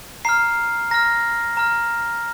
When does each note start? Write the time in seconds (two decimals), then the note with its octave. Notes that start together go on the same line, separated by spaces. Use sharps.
0.25 A#5 F6 C7
0.91 A#5 F6 A#6
1.57 A#5 F6